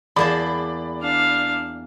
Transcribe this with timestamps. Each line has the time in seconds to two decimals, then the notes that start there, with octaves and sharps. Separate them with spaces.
0.16 E2 A#3 D5 A5 B5
1.00 D4 F5